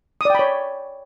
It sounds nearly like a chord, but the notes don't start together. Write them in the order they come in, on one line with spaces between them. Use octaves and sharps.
D#6 D5 G5 B5 C#5